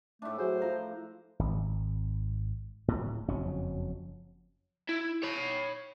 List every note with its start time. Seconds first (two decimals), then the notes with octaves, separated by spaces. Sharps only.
0.22 A2 A3 D4
0.38 F#3 F#4 G#4 C5
0.62 F3 F4 A#5
1.39 G#1
2.88 D1 A2
3.28 F#1 F2 F#3 C#4
4.89 E4
5.23 C#5 B5